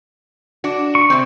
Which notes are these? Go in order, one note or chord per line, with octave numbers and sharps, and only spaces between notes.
D4 F#4
C#6
C3 C4